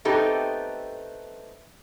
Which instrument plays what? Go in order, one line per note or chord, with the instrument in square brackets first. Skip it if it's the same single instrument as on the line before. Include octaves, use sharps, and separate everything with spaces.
[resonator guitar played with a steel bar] A3 B3 C4 D#4 G4 A4